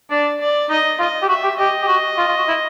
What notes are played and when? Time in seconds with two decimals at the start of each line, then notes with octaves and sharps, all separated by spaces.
0.10 D4 D5
0.40 D5
0.69 D#4 D#5
0.99 F4 D#5
1.22 G4
1.29 F#4 E5
1.44 G4
1.58 G4 D#5
1.82 G4
1.88 F#4
2.18 F4
2.28 F4
2.37 F#4
2.48 E4